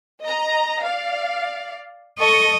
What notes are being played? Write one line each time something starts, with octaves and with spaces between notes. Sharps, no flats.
D#5 A#5
D5 F5
A4 D#5 C#6